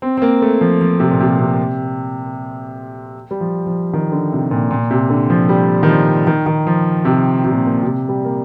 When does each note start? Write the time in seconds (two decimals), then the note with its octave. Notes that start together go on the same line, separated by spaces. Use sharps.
0.02 C4
0.17 C4
0.22 A#3
0.42 A3
0.61 F3
0.81 F3
1.00 C3
1.11 A#2
1.20 C3
1.39 C3
3.31 G3
3.41 F3
3.66 F3
3.93 D#3
4.12 D3
4.32 C3
4.51 A#2
4.71 A#2
4.91 C3
5.10 D3
5.30 F3
5.49 G3
5.83 D#3
5.89 F3
6.27 D#3
6.46 D#3
6.67 F3
7.05 C3
7.44 C3
7.51 A#2
7.66 A#2
7.83 C3
8.09 G3
8.25 A#3